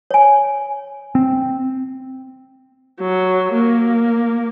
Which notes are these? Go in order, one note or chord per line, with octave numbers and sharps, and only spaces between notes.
C#5 G#5
C4
F#3
A#3